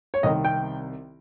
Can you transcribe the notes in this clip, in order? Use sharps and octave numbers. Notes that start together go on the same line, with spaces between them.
C#5
C2 C3 D#3 D#5
G5